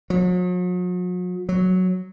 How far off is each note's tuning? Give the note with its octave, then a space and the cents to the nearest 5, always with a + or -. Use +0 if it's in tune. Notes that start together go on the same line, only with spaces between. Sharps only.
F#3 -45
F#3 -5